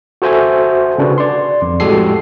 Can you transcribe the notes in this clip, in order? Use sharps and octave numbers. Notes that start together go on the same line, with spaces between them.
F#4 A4 C5 E5 G#5
C#3 D4 F#4 B4
D5 C6
F2
A2 G#3 F#4 G4 A4 C7